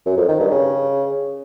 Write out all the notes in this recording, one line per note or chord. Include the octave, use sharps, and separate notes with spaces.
F#2
F2
D#3
G2
C#3